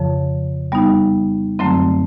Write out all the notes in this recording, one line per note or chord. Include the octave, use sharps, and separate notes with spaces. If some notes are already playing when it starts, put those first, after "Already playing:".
Already playing: F2 C#3 F3
G3 B3 D#4
F#2 D3 F#3 A3 C4